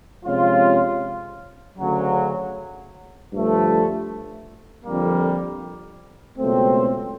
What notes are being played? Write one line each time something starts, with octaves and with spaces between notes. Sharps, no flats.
C3 F3 G#3 C#4 F4
D2 C#3 F#3
G2 D3 F3 A3
F2 D3 G3 A#3
C#2 B2 F#3 A3 C4